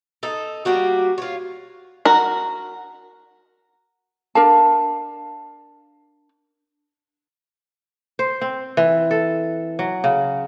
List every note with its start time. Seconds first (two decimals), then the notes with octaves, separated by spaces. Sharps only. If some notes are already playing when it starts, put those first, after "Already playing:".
0.23 D#4 A4
0.65 G3 A#3 F#4 G4
1.18 F4 C#5
2.05 F#4 A#4
4.35 D4 A#4 F5 A5
8.19 C5
8.41 C4
8.77 E3
9.11 A4
9.79 F#3
10.04 C#3